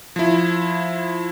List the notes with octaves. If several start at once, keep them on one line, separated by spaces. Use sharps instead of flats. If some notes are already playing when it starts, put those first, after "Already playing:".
F3 E4